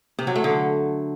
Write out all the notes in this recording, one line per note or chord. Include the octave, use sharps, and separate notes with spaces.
C3
F#3
A3
D3